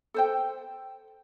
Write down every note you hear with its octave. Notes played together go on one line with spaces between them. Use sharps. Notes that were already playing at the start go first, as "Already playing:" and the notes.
A4 C5 G5